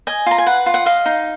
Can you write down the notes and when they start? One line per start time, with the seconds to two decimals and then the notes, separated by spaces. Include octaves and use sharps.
0.07 D#5 G#5
0.26 F4 A#5
0.38 G#5
0.46 B4 F#5
0.66 F4
0.74 F#5
0.86 D#5 F5
1.05 D#4